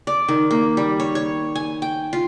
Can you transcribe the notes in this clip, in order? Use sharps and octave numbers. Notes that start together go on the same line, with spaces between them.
D5
D#3
A#3
G3
C#5
C#5
G#5
G5
F4